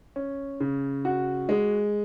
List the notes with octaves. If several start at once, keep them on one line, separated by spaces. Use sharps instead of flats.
C#4
C#3
F#4
G#3